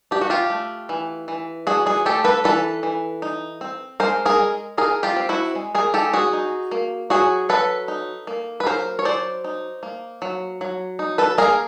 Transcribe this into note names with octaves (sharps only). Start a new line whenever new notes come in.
D4 G4
F#4
F4 G4
A3
E3
E3
D4 F#4 G#4
F#4 G#4
A3 G4 A4
A4 B4
E3 A4 B4
E3
D#4
C4
G#3 A#4 C5
G#4 A#4
G#3
D#4 G#4 A#4
F4 G4
C4
E4 F#4
G#3
G#4 A#4
G#3 G4 A4
F#4 G#4
D#4
A#3
F#3 F#4 G#4
F#3 A4 B4
D#4
A#3
B4
F#3 A#4 C5
C#5
F#3 C5 D5
D#4
A#3
F#3
F#3
D#4
A4 B4
A#3 G#4 A#4